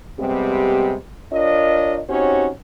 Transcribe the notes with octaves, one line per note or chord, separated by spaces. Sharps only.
C3 G3 G#3 B3 C4 G4
D4 F4 A#4 C#5 D#5
C4 C#4 D#4 F#4 G4 C#5